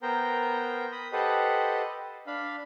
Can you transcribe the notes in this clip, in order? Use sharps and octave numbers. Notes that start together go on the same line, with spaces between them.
B3 A#4 C5 G5 A#5
B5 D#6
G4 A4 B4 C5 D#5 F#5
D4 F5 B5